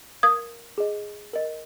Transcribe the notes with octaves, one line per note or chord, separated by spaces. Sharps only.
A#4 F5 D#6 G#6
G#4 D#5
A#4 D#5